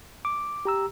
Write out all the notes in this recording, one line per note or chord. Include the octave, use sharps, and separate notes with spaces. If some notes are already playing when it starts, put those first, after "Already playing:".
D6
G4 A#5 E6